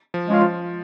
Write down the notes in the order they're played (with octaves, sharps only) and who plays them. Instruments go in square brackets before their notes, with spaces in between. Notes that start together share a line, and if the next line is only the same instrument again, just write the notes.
[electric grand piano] F3
[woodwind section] G#3 C#4 F4
[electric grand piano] F3